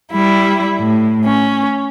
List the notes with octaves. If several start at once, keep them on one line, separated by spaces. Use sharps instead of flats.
G3 E4
A2
C#4